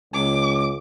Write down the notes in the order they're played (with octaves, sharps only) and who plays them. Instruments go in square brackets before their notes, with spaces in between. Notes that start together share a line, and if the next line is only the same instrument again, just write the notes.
[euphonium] C#2 [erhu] D6